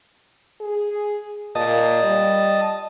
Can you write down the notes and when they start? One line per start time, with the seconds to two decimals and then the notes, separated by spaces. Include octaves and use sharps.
0.61 G#4
1.55 A#2 D#5 A5
2.03 G3